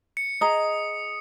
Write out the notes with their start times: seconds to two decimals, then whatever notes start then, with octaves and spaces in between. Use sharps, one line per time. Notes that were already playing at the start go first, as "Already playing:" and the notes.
0.17 C#7
0.41 G#4 D#5 A#5 D#6